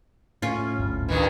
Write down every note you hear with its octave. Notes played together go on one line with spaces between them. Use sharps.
A2 C#4 F4
G1 D2 A2
G2 D#3 E3